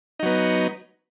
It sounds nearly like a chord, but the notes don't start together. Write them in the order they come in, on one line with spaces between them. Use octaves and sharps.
D#4 F#3 B3